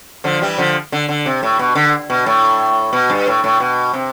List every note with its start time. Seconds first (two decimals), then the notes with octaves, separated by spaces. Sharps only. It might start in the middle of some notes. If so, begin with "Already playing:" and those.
0.24 D3 F3
0.41 E3 G3
0.58 D3 F3
0.92 D3
1.09 D3
1.26 C3
1.43 A2
1.59 B2
1.75 D3
2.10 B2
2.26 A2
2.93 B2
3.10 G2
3.27 A2
3.44 A2
3.60 B2
3.93 C3